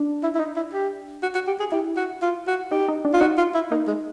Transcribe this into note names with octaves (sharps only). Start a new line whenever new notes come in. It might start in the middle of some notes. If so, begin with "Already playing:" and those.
Already playing: D4
E4
E4
D#4
E4
G4
F#4
F#4
G4
G#4
E4 G4
F#4
F4
F#4
D#4 G4
D#4
D4
F4
D#4 F#4
F4
E4
A#3 D#4
G#3